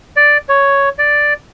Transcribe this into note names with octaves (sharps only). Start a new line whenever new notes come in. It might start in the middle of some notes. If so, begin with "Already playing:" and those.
D5
C#5
D5